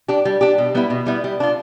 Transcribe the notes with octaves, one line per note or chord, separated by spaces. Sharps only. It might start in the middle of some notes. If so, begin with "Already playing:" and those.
D4 G4
G3
D4 G4
B2
G3 B3 E4
B2
G3 B3 E4
G3
D4 F4